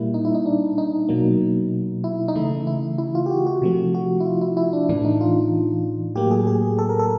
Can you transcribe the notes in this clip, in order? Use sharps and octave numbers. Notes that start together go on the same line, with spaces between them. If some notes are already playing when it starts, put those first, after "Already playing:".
Already playing: A#2 G3 A#3 E4
D#4
E4
D#4
D4
D#4
B2 F#3 A#3
E4
D#4
C#3 E3 A3 E4
E4
E4
F4
G4
F#4
F#4
C3 F3 A3
F#4
E4
F4
E4
E4
D4
A2 E3 A3 D4
D#4
F4
A2 F#3 A#3 G4
G#4
G#4
A4
A#4
A4